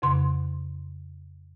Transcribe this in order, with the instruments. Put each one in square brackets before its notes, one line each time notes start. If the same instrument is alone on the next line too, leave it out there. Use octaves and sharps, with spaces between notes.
[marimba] F2 C#3 C6